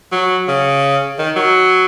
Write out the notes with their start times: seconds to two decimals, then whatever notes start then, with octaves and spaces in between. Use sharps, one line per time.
0.12 F#3
0.48 C#3
1.18 D#3
1.36 F#3